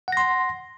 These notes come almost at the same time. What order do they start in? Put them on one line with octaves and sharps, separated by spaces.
F#5 A#6 C6